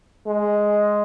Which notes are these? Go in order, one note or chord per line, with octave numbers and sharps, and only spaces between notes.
G#3